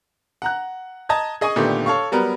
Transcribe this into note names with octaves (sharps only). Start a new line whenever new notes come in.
F#5 A#5 F#6
D#5 A5 A#5 G#6
G#4 D#5 G#5 C#6 D#6
A#2 D3 D#3 A3 B3 G4
A4 C#5 F5 C#6
F#3 G3 B3 A#4